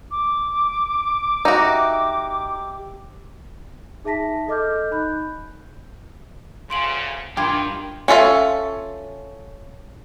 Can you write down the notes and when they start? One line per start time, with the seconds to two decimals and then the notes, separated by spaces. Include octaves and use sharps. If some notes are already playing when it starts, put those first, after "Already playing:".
0.11 D6
1.45 D#4 F#4 G4 E5
4.04 D#4 G#4 E5 A5 A#6 B6
4.48 A4 D#5 D6 F6 G6
4.91 D#4 B5 F#6 G6
6.70 D2 C#3 C6 D7 F#7
7.37 G2 D#3 F4 G4 G5 G#6
8.08 C#4 F4 A4 E5